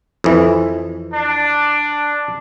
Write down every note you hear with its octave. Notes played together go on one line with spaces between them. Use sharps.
F2 E3
D4